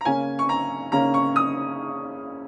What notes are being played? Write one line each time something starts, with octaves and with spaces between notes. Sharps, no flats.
A#5
C#3 A#3 C#4 G#5
C#6
A#5
C#3 A#3 C#4 A#5
C#6
D#6